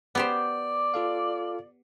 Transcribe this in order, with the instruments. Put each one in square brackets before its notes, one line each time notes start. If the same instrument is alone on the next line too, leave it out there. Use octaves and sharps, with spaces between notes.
[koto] B3 G4 C5 [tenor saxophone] D5 [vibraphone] D6
[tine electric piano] F4 A4 F5